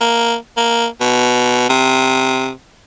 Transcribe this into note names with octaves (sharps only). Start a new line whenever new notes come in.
A#3
A#3
B2
C3